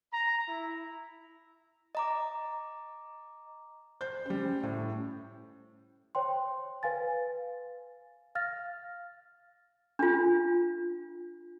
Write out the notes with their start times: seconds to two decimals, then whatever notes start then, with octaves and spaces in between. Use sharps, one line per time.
0.13 A#5
0.48 E4
1.95 D#5 A#5 D6
4.01 C5 G6
4.26 G3 C#4 C5
4.63 A2
6.15 C5 C#5 G5 C6
6.83 B4 F5 G#5 A6
8.35 F5 F6 A6 A#6
9.99 D4 F4